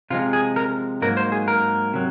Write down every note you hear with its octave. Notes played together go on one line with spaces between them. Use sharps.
C3 F3 G#3 F4
G#4
A#4
G#2 F#3 A#3 A#4
C5
G#4
A#4
C3 F#3